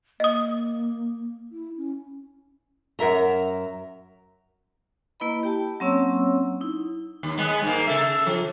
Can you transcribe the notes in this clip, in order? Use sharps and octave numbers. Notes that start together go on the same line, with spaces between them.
A#3 D#5 D#6
E4
C#4
F#2 A#4 E5 A#5
A#3 E4 B4 D#5 B5
G4 G5 A5
F#3 A#3 C4 C#4 C#5 E6
D#4 E4
D#2
G#3 B3
G#2 A#3
C#3 A4 E5
F3